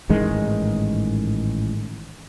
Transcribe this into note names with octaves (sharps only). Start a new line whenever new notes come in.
A1 G#2 D#3 G#3